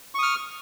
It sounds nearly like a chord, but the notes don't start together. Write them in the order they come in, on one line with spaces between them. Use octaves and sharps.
C#6 D#6 F6